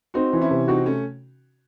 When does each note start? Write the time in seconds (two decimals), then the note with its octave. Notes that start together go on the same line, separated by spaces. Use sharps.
0.14 C4 D#4 F#4
0.33 E3
0.41 C#4 E4
0.51 C3
0.68 C4 D#4 F#4
0.86 A3 C#4